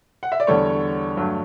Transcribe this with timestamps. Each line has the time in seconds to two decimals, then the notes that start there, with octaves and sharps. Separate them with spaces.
0.23 F#5
0.32 E5
0.40 D5
0.47 E2 D3 G3 A4 C#5
1.17 G2 F#3 A3